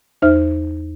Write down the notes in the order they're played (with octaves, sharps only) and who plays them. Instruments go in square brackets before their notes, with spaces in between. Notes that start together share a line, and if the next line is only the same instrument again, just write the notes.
[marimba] E2 D#4 C5 E5 F6